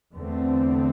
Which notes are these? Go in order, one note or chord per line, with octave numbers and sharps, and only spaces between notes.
E2 D3 A3 C4